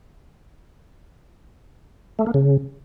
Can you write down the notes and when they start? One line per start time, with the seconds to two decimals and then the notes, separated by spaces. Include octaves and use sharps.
2.19 A3
2.27 A#3
2.34 C#3